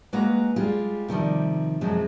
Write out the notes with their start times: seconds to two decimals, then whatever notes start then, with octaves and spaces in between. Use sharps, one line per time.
0.13 G#3 A#3 F#4 B4 F#5 A#5
0.56 G3 G#3 F4 G4
1.08 C3 D#3 F3 G3
1.81 F#2 C3 F3 F#3 G#3 C4